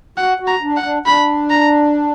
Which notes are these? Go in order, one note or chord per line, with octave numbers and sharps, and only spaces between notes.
F#4 F#5
F#4
A#5
D4
F#5
D4
D4 B5
A#5